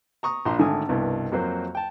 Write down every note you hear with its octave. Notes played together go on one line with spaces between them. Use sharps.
A#5 C#6 D#6
A#1 D4 A#5 C6
G#1 D3 A3 G#5 D#6
C2 G2 B2
F2 F#3 A#3 C5
G5 A5